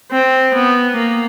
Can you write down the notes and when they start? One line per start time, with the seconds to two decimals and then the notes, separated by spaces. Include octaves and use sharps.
0.12 C4
0.54 B3
0.97 A#3